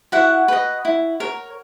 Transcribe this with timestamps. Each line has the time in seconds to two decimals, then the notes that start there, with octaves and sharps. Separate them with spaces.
0.12 E4 F#4 F#5
0.48 B4 D#5
0.85 E4
1.20 A#4 C#5